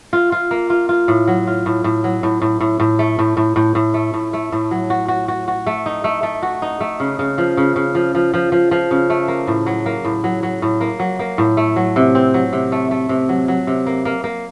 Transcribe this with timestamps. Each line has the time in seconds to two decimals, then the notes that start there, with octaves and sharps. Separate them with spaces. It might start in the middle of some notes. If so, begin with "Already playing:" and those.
0.13 F4
0.32 F4
0.51 A#3
0.70 F4
0.89 F4
1.08 A2
1.28 F#3
1.47 F4
1.66 A2
1.84 A2
2.04 F#3
2.23 A2
2.42 A2
2.60 A2
2.80 A2
2.99 A3
3.19 A2
3.37 A2
3.56 A2
3.75 A2
3.94 A3
4.14 A2
4.33 A3
4.52 A2
4.71 F#3
4.90 F#4
5.08 F#4
5.28 F#4
5.48 F#4
5.67 A3
5.86 D#4
6.04 A3
6.23 A3
6.43 F#4
6.62 D#4
6.80 A3
7.00 C#3
7.19 C#3
7.38 F3
7.57 C#3
7.76 C#3
7.95 F3
8.15 F3
8.34 F3
8.52 F3
8.71 F3
8.91 C#3
9.10 A3
9.28 A#3
9.47 A2
9.66 F#3
9.86 A#3
10.05 A2
10.24 F#3
10.43 F#3
10.62 A2
10.81 A#3
11.00 F#3
11.19 A#3
11.38 A2
11.57 A3
11.76 F#3
11.96 C3
12.15 C4
12.34 F#3
12.53 C3
12.72 A3
12.91 A3
13.09 C3
13.29 F#3
13.48 F#3
13.67 C3
13.87 A#3
14.05 A#3
14.24 A#3